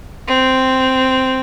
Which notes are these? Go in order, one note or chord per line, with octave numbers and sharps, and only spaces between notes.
C4